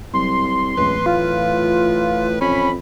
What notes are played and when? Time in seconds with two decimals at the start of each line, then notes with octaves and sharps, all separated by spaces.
0.14 C2 F#3 C6
0.77 D1 C#2 E3 B4
1.06 A2 F4
2.41 F2 C#4 B5